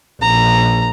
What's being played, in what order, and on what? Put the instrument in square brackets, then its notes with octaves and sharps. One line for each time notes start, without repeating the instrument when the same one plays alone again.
[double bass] A#1 [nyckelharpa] A#5